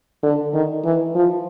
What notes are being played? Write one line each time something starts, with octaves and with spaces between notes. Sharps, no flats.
D3
D#3
E3
F3